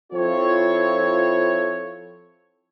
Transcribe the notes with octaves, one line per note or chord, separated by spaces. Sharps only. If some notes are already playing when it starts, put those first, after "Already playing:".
F3 C4 E4 F4 A4 C#5